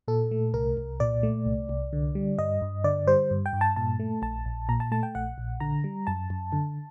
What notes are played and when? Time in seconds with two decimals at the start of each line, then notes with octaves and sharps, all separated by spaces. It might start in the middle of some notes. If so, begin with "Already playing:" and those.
0.08 A#2 A4
0.31 A3
0.54 C2 A#4
0.77 C2
1.00 A#2 D5
1.23 A3
1.46 C2
1.69 C2
1.93 D3
2.15 G3
2.38 G2 D#5
2.62 G2
2.84 D3 D5
3.07 G3 C5
3.31 G2
3.46 G5
3.53 G2
3.61 A5
3.76 A#2 A5
3.99 A3
4.22 A#1 A5
4.46 A#1
4.69 A#2 A#5
4.80 A5
4.92 A3 A5
5.03 G5
5.15 A#1 F#5
5.38 A#1
5.60 D3 A#5
5.84 G3
6.07 F#2 A5
6.30 F#2
6.52 D3